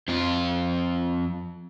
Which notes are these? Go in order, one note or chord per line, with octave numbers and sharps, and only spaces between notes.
F2 F4